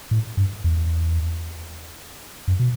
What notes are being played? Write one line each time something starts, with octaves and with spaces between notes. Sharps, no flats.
A2
G2
E2
F#2
B2